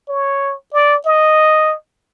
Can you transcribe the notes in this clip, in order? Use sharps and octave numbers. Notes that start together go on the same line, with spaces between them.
C#5
D5
D#5